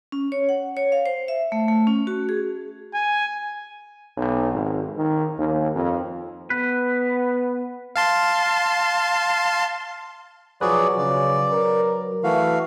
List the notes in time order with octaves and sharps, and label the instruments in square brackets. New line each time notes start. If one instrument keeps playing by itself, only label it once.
[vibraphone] C#4
C#5
F#5
C#5
F5
C5
E5
A3
A3
C#4
F#4
G#4
[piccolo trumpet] G#5
[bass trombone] B1
G#1
D#3
D#2
F2
[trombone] B3 [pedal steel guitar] B4
[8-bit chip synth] F5 A5 C6
[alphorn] F3 [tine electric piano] F#3 B4 [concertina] F#4 G#4 D5
[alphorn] C#3 [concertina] D5
[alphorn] A#4
[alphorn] E3 [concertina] A3 F#4 F5